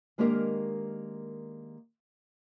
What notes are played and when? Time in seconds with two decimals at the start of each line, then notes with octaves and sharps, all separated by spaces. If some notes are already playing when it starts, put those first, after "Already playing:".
0.18 D#3 G#3 A#3 D4 G4 A#4